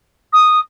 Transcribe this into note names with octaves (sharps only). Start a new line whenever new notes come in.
D#6